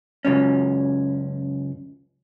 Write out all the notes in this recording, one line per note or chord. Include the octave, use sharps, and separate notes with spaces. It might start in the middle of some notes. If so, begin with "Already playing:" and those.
C#2 F#2 C#4